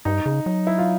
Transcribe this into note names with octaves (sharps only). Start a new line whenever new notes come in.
G2 D#4
C#3
F#3
E4
F4